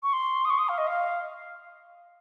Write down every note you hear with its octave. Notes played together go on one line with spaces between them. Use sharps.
C#6
C6
D#6
C#6
D#6
F5
D#5
F5